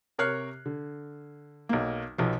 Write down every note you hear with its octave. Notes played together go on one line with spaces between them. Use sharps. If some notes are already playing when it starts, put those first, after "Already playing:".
C3 A#4 C#5 F6 F#6 C7
D3
B1 A#3
B1 B2 F3